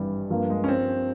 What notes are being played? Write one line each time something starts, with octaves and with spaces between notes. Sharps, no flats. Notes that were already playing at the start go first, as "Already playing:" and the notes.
Already playing: G#1 G2 E3 G3
G2 F3 A#3
G#3
C#4
C4